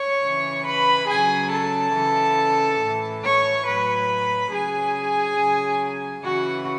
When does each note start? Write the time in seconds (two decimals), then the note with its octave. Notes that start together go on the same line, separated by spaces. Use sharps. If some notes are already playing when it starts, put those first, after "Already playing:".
Already playing: C#5 C#6
0.23 C#3 E3
0.66 B4 B5
1.08 C#3 F#3 G#4 G#5
1.52 A4 A5
1.95 C#3 E3
2.81 A2 E3
3.23 C#5 C#6
3.66 A2 F#3 B4 B5
4.52 C#3 F#3 G#4 G#5
5.38 C#3 F#3
6.24 C#3 E3 F#4 F#5